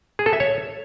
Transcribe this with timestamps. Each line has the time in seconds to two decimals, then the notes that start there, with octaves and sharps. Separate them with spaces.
0.19 G#4
0.26 A4
0.33 E5
0.40 C#5